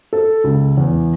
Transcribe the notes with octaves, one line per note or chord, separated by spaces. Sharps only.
A4
C#2
E2